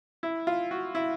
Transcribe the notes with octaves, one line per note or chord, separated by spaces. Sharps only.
E4
F4
F#4
E4